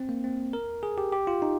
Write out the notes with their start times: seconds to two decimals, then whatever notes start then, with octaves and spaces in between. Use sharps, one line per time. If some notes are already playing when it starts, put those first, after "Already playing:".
Already playing: C4
0.09 A#3
0.24 C4
0.53 A#4
0.83 G#4
0.98 G4
1.12 G4
1.27 F4
1.42 D#4